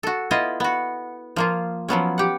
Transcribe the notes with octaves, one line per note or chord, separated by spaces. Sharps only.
F#4 A4
B3 E4 F4 D#5
B3 F#4
F3 A#3 F4
F3 F#3 B3 C#4
G4 F#5